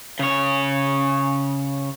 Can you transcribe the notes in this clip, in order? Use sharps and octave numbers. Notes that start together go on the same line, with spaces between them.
C#3 C#5